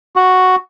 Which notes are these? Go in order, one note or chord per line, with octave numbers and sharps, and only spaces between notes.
F#4